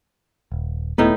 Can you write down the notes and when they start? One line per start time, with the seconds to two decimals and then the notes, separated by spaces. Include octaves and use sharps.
0.52 D#1
0.98 D#1 A2 B3 D#4 B4